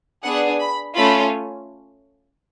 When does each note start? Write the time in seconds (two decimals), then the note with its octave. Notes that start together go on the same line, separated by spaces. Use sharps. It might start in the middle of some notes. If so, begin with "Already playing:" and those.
0.23 B3 D4 G#4 F#5
0.60 B5
0.95 A3 C#4 F4 B5